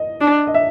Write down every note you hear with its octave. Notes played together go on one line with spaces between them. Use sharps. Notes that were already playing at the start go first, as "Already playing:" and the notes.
Already playing: D#5
D4
D#5
E5